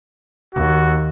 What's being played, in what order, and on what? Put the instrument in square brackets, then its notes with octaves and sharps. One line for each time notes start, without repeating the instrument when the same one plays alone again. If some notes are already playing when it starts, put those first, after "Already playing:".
[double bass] D#2 [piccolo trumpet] F#4